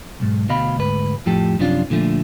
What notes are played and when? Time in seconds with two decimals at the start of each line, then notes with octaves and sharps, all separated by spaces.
0.20 B1 G#2
0.49 D2 B2 D#5 F5 B5
0.76 D2 G#2 B4
1.26 F2 A2 F3 G4 A4
1.59 F#2 C3 F3 C#4 D4 F4
1.90 A#2 D3 F3 A3